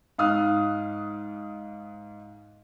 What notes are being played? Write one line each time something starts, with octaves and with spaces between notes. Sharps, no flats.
G#2 F5 D#6 F6 F#6